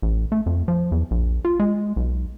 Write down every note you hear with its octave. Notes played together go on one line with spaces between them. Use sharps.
A1
A3
F2
F3
E2
A#1
F4
G#3
B1